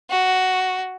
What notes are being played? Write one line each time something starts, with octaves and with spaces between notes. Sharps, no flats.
F#4